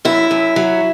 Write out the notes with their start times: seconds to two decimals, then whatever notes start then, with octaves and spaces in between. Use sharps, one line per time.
0.05 F#2 E4
0.31 F#2
0.56 F#3